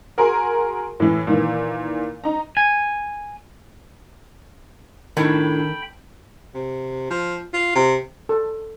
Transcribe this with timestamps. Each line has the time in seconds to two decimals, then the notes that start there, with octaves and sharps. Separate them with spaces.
0.18 F#4 G#4 A#4 G#5 C6
1.00 A2 E3
1.27 A#2 D#3 E3
2.24 D#4 A#5
2.57 G#5
5.17 A2 D#3 D4 G5 B5
6.55 C3
7.10 F3
7.54 F4
7.75 C3
8.29 A4